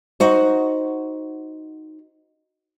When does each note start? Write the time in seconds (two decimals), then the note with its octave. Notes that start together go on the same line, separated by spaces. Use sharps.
0.20 D#4 F#4 C5